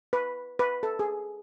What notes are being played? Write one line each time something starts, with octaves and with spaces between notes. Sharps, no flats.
B4
B4
A4
G#4